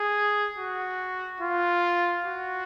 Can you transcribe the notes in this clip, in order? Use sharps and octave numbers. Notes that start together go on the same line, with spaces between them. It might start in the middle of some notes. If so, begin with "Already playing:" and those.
Already playing: G#4
F#4
F4
F#4